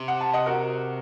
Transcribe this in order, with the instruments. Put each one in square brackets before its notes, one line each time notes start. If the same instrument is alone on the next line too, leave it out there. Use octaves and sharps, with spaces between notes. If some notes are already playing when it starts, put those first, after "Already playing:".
Already playing: [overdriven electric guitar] C3
[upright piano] F#5
A5
D#5 F#5
F#4 A#4